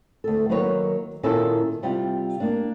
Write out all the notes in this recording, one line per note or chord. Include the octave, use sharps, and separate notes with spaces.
D2 A4
D#3 F#3 A#3 B4 C#5
A#2 D#3 C#4 E4 F4 A4
C3 G3 F4 G5
A#3 D4